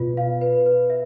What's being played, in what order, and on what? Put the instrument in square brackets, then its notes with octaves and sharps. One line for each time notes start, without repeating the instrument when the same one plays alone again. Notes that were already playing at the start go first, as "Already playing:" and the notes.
Already playing: [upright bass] B2 [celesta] F4 B4 D5
[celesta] F5
B4
B4
E5